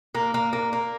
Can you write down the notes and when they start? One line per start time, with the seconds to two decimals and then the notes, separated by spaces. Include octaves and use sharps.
0.15 A#3
0.34 A#3
0.53 A#3
0.73 A#3